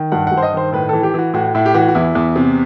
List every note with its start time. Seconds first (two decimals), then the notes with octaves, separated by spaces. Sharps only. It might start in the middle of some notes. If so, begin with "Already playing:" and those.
Already playing: D#3
0.12 G2 F#5
0.27 G2 F#5
0.37 C5
0.43 D#5
0.53 D#3 C5
0.72 A2 B4
0.89 E3 A4
1.03 G4
1.14 E3 F#4
1.34 A2 F#4
1.55 A2 E4
1.66 G4
1.74 E3 F#4
1.88 F#4
1.95 E2 E4
2.15 E2
2.36 C3